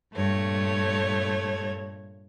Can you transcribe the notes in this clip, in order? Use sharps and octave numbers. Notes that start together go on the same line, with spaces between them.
G2 A#2 A3 C#5